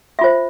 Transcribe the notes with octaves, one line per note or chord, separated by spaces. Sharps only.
F4 C5 E5